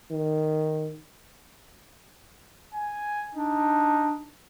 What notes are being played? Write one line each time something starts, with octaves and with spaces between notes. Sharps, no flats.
D#3
G#5
D4 D#4